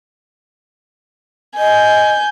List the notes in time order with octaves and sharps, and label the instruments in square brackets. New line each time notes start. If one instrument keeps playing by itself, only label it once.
[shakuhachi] D#5 [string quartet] G#5 G6